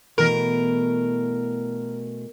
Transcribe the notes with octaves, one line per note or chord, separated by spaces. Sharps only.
B2 E3 A3 A#4